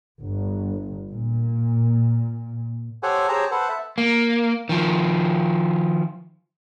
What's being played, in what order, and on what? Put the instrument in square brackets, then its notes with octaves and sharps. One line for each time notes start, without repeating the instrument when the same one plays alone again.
[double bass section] G1
A#2
[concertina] G4 A4 C5 C#5 F#5 G#5
G4 G#4 C5 C#5 A5 A#5
A4 B4 C5 F#5
E5 A5
[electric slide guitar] A#3
D#3 F3